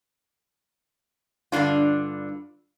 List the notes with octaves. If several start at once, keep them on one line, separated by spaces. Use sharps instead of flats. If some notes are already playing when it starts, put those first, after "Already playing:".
G2 B2 D3 D4 F4